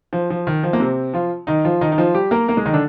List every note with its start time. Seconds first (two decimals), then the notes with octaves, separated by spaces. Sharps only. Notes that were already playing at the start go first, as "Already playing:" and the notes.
0.13 F3
0.30 F3
0.47 D#3
0.63 F3
0.73 A#3
0.80 C3 C4
1.13 F3 F4
1.47 D#3 D#4
1.65 F3 F4
1.81 D#3 D#4
1.92 D#4
1.98 F3 F4
2.14 G3 G4
2.31 A#3 A#4
2.48 A#3 A#4
2.57 G#3 G#4
2.66 D#3 D#4
2.73 D3 D4